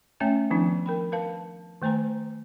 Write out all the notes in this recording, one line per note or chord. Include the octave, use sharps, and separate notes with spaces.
A3 C#4 C#5 E5 G5 G#5
D#3 F3 B3 C4 D4 E4
A#4 G5 B5
A#4 B4 F5 A5
D#3 A3 C5 G#5 A#5